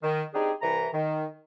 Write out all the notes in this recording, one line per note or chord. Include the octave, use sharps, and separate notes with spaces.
D#3
C4 D4 D#4 G4 G#4
C2 E3 A#5
D#3